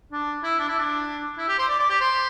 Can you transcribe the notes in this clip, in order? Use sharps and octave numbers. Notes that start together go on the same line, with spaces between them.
D4
E4
D4
E4
D4
E4
G4
C5
D5
D5
G4
C5